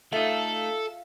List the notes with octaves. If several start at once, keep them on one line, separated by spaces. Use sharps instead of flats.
A3 D#4 F4 A4 E5 F5